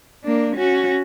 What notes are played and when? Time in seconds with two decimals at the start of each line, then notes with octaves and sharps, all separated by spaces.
0.24 A#3 D4
0.57 C#4 F#4